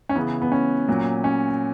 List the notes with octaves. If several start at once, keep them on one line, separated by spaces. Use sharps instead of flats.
C#4
C#3 E3 B3
B3
C#4
A#2 F#3
C#4